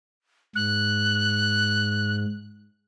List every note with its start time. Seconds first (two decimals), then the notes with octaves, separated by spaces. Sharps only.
0.55 G#2 F#6